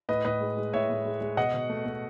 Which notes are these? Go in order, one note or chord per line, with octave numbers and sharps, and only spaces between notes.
A2 B4 D#5
A2 B4 D#5
G#3
G#3
A2 C#5 E5
A2
G#3
G#3
B2 D#5 F#5
B2
A3
A3